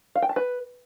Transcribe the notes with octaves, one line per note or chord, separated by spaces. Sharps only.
F5
G5
A5
B4